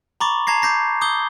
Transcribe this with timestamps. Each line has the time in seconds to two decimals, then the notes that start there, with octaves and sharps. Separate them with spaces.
0.20 A#5 B5 C#6 D6 A6
0.47 A5 A#5 G#6 A#6 C7
0.62 D6 G6 A#6 C7
1.01 D6 D#6 G6 G7